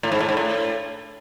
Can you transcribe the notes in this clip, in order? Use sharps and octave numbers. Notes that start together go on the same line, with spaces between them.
A2
G#2
A2
G#2
A2